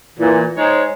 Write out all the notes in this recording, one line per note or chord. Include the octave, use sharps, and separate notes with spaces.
A#2 E3
G#3 D#4 C5 C#5